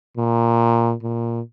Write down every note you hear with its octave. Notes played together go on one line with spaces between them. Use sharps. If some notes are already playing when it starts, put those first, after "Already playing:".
A#2
A#2